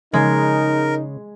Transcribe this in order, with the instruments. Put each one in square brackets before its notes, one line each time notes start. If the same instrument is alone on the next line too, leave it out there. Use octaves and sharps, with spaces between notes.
[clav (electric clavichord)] C#3 [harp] G#3 [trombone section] D#4 [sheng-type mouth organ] A#4